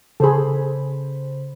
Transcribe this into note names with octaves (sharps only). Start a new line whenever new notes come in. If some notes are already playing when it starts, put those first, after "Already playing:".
C#3 G#4 A4 C5 B5